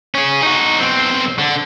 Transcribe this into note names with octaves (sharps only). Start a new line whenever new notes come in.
C#4 G#4
D#4 F#4
B1 C4
D3